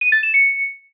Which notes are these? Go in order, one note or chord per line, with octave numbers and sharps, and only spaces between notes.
D#7
A6
E7
C#7